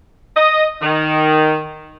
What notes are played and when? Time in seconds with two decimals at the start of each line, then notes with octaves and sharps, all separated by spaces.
0.36 D#5
0.82 D#3